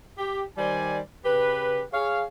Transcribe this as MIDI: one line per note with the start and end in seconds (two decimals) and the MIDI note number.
0.18 0.43 67
0.58 1.00 51
0.58 1.00 55
0.58 1.00 72
0.58 1.00 74
0.58 1.00 80
1.25 1.83 49
1.25 1.83 67
1.25 1.83 71
1.93 2.24 68
1.93 2.24 73
1.93 2.24 77